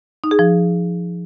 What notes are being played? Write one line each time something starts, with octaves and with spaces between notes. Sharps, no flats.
D#4
G#4
F3